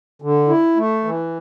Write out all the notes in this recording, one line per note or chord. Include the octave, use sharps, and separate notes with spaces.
D3
E4
A3
E3